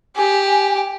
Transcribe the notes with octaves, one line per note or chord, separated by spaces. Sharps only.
G4 G#5